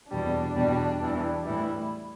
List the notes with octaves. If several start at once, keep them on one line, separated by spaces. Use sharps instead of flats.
E2 B2 G3 D4
E2 B2 G3
E2 E3 G3
A2 E3 G3 E4